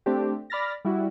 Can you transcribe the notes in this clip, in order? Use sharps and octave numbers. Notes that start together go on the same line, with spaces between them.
A3 C4 D4 G4
D5 B5 F6 A6 A#6
G3 E4 F#4